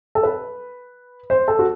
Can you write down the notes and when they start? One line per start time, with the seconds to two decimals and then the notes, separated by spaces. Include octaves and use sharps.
0.15 A4
0.23 B4
1.30 C5
1.48 A4
1.59 F#4